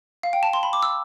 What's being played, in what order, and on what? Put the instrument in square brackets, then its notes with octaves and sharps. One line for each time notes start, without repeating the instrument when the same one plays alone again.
[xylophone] F5
G5
A5
C6
B5
D6
E6